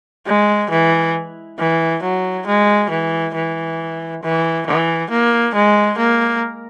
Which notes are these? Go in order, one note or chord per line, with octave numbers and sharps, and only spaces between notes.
G#3
E3
E3
F#3
G#3
E3
E3
E3
E3
A#3
G#3
A#3